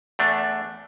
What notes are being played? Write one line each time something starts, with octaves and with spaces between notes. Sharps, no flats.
E2 A3 D4